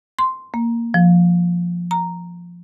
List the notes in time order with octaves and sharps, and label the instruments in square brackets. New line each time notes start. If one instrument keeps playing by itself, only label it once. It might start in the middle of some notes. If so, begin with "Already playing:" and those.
[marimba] C6
A#3
F3
A#5